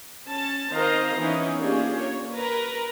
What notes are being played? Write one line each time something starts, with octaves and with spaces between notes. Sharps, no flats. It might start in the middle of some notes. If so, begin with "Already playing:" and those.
C#4 A5
D#3 C4 C5 D#5 F5 A#5
E3 B3 C#4 D#4 C#5
A#3 C#4 D4 F4 G4 G#4
A#3 C#5
A#4 B4 A#5